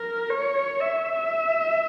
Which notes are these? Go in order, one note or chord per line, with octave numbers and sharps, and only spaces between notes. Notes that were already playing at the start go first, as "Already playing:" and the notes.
Already playing: A#4
C#5
E5